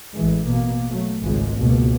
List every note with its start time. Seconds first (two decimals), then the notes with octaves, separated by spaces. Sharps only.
0.15 A1 E3 G#3
0.48 B2 A#3
0.89 F#3 A3
1.22 G#1 C#2 A2 G#3
1.59 C#2 B2 A#3